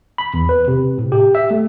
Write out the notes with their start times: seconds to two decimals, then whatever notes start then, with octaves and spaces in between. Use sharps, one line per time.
0.18 B5
0.34 E2
0.49 B4
0.68 C3
0.98 A2
1.12 G4
1.35 E5
1.51 A3